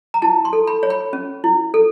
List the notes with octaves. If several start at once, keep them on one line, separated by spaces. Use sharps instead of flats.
A#5
E4 A5
C6
A4
B5
C#5
B5
C#4
E4
A4